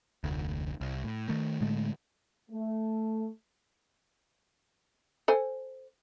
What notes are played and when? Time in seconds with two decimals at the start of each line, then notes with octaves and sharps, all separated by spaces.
0.24 F1 D2
0.81 C2
1.04 A2
1.29 D#3 A3
1.61 A2 D3 G#3 A3
2.51 A3
5.28 A4 C5 G#5